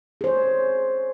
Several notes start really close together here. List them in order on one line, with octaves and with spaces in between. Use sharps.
G#4 C5 C#5